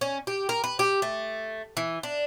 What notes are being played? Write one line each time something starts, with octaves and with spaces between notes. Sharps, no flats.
C#4
G4
A#4
B4
G4
A3
E3
D4